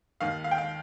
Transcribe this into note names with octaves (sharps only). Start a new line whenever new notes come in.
D#2 D#3 F5
F5
G5
F5